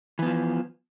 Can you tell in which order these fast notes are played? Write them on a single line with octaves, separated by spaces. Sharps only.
E3 B3 F3